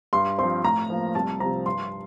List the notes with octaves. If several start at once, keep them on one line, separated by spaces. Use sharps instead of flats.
G2 C6
F3 C4 C6
A2 A#5
F3 A#3
C2 A5
C3 F3 C4 A#5
G2 C6